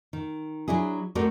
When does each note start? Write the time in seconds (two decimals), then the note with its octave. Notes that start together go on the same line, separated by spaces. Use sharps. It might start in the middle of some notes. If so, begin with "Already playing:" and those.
0.13 D#3
0.68 F#3 D4 E4 G#4
1.15 A3 C4 F#4 A#4 D5